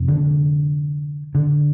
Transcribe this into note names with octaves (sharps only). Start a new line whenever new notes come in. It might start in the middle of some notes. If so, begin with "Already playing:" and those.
Already playing: F2 C3
D3
D3